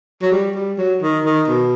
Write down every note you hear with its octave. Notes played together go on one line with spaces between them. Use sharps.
F#3
G3
G3
F#3
D#3
D#3
B2